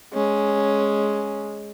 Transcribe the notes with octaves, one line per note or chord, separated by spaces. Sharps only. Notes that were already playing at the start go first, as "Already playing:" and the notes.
G#3 C#4